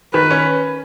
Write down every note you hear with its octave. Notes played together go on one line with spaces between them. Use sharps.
D#3 B4
C#4